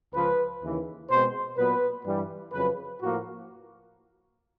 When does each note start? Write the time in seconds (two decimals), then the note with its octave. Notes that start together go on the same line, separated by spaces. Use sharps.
0.13 C#2 C#3 F3 B4
0.62 D#2 C#3 E3
1.09 B2 G#3 C4 C5
1.57 A#2 F#3 B3 B4
2.05 G2 E3 G3
2.53 F2 C#3 F#3 B4
3.00 A2 F3 A#3 F#4